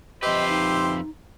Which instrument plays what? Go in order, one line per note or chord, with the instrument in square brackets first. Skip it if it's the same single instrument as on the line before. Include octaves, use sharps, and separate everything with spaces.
[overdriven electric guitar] F2 B4 [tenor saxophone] G4 [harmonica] C5 E5 C6 [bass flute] D#5
[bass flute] D#4